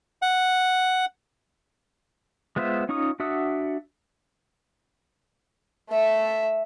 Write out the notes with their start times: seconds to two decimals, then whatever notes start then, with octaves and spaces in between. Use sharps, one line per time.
0.22 F#5
2.56 G#3 B3 F4 C5 E5
2.89 C#4 D#4 F4 C#6 D#6
3.20 D4 F#4 E5 F#5 D#6
5.90 A3 E5